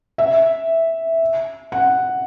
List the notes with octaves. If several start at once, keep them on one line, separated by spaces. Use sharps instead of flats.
E5
F#5